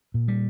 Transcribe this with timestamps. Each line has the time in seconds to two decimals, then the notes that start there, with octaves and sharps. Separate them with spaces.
0.14 A#2
0.28 G3